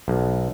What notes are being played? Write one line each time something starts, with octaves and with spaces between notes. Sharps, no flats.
B1